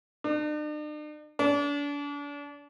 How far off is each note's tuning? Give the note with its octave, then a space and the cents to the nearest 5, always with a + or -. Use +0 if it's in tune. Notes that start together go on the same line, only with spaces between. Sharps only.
D4 +45
D4 -35